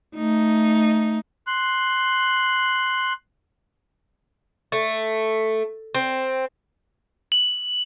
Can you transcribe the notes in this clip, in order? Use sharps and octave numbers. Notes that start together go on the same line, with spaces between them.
A3 D#4
C6 F#6
A3
C4
F#7